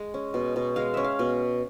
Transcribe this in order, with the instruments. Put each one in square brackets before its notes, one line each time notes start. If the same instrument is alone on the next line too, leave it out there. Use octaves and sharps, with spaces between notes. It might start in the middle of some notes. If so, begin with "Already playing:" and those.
Already playing: [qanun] G#3
C#4
B2
B2
G#3 F5
C#4 E5
F5
B2